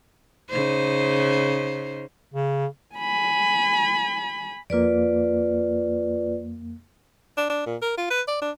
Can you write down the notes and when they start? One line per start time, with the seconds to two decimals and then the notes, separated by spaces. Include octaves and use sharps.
0.50 C#3 D#4 C5
2.34 C#3
2.96 G#5 B5
4.70 F2 A#3 F4 B4 D5
7.37 D4
7.50 D4
7.66 A#2
7.82 A#4
7.97 F4
8.11 B4
8.28 D5
8.42 D4